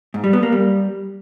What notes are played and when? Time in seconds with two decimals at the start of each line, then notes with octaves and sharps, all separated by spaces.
0.14 G#2
0.24 G3
0.33 B3
0.43 A#3
0.52 G3